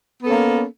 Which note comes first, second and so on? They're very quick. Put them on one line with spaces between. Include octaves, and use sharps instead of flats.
B3 A4 C#4 A#3